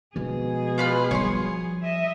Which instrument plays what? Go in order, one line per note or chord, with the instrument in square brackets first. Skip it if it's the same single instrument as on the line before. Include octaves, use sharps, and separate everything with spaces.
[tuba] B2 [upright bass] F3 G#3 [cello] G#4
[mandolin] F4 B4 F6
[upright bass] F3 G3 [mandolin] C#5 C6
[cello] D#5 E5